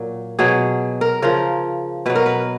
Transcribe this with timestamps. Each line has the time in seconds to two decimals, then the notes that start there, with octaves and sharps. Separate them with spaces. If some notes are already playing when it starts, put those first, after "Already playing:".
Already playing: A#2 F#3
0.39 B2 F#3 G#4
1.01 A#4
1.22 C#3 F3 A#4
2.06 B2 F#3 B4
2.15 A#4
2.26 B4